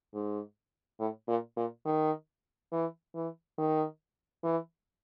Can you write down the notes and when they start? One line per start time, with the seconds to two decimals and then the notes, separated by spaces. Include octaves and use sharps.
0.14 G#2
0.99 A2
1.28 A#2
1.57 A#2
1.85 D#3
2.72 E3
3.15 E3
3.58 D#3
4.44 E3